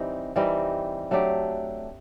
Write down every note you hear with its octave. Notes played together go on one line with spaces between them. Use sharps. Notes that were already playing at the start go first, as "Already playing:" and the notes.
Already playing: E3 G3 C4 D#4
E3 G3 C4 D#4
F#3 A3 D4 G4